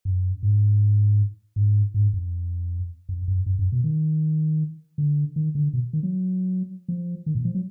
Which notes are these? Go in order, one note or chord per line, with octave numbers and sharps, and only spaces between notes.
F#2
G#2
G#2
G#2
F2
F2
F#2
F#2
F#2
B2
D#3
D3
D#3
D3
B2
D#3
F#3
F3
D#3
A#2
F3
F#3